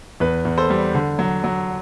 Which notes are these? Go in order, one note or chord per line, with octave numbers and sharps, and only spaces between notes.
E2 B4
E2
A4 C5
G3
D3
F#3
F#3